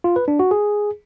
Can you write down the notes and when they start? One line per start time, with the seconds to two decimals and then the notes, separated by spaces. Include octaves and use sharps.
0.04 F4
0.16 B4
0.28 D4
0.39 F#4
0.51 G#4